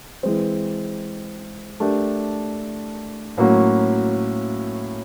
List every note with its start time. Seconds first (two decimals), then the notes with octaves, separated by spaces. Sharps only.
0.23 E3 G#3 C4
1.80 A3 D4 G4 A#4
3.37 A2 F#3 A#3 C#4 F#4